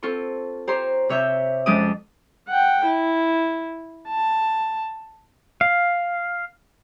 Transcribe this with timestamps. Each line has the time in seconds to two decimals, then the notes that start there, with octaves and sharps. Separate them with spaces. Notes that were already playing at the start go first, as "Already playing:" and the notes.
0.03 C4 F4 A4 C#6
0.68 G4 C5 C#5 A#5 C6
1.09 C3 C#5 E5 G6
1.66 F2 F3 G#3 C#4 D6 D#6
2.49 F#5 G5
2.85 E4
4.08 A5
5.61 F5